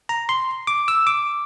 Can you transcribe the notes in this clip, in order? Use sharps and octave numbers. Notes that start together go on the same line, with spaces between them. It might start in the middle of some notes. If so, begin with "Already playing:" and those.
A#5
C6
D6
E6
D6